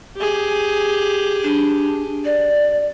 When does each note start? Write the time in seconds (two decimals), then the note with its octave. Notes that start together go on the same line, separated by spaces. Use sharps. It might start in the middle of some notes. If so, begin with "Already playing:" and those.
0.16 G4 G#4
1.43 D4
2.25 D5